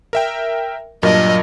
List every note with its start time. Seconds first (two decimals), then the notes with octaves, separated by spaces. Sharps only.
0.13 A#4 E5 G5
1.03 G2 A#2 F#3 F4 A#4 D#5 A5